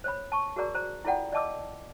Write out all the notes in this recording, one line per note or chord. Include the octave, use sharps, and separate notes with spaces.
C5 C#5 B5
A5 C#6
F#4 G#4 A#4 D5 A#5
C5 A#5
E4 F4 A4 D5 F#5 G5
D5 D#5 A5 D6 E6